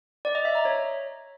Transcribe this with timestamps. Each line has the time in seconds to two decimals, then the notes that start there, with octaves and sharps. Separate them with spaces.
0.25 D5
0.35 D#5
0.45 E5
0.55 A#5
0.65 C#5